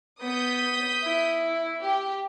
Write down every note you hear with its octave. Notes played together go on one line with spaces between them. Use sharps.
B3 D#6 G6 B6
E4
G4